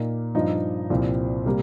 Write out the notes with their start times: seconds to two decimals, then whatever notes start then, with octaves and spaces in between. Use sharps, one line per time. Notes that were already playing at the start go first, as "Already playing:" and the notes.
Already playing: A#2 A#3 D#4
0.35 G2 F3 D#4
0.90 C2 A#2 F3 C4
1.46 C3 G3 A#3